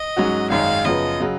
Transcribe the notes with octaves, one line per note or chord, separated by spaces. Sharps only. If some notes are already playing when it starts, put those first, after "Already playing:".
Already playing: D#5
G#2 F#3 C#4 F#4
G#1 F#2 D#3 G#3 F5
F#2 C#3 F3 B3 D#5
C#3 F#3